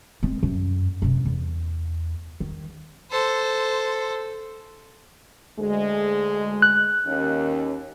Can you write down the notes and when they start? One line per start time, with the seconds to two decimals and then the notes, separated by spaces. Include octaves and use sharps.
0.23 G#3 C4
0.43 F#2
1.02 F#2 C3
1.25 E2
2.40 D#3
3.11 A4 C5
5.58 D2 G#3
6.62 F#6
7.06 D#2 D#3 C#4